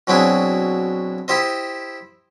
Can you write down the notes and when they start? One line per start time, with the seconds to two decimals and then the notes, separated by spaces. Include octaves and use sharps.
0.07 B2 F#3 C4 D4 E4 G#4
1.28 E4 G4 C5 D#5